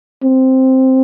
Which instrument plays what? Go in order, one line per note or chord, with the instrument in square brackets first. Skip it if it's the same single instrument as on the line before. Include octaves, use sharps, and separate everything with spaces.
[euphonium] C4